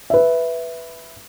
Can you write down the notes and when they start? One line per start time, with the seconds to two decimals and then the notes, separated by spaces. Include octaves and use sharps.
0.10 B4 E5